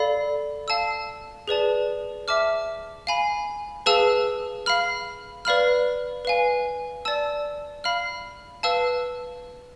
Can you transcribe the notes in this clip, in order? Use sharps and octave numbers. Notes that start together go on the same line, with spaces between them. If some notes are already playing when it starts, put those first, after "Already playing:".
Already playing: A4 D5 F5 B5
F5 A5 E6
G#4 B4 D5 A5
E5 A5 D6 F6
F5 G#5 B5
G#4 B4 F5 A5 E6
F5 B5 F6
B4 D5 F5 B5 F6
B4 F5 G#5
D5 A5 E6
F5 B5 F6
B4 F5 A5 E6